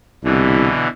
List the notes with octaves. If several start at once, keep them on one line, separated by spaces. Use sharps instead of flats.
C2 B2 D3 E3